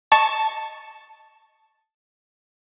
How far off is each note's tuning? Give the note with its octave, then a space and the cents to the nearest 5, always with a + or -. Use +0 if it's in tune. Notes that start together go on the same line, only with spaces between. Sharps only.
D#5 +0 A5 +0 C#6 +0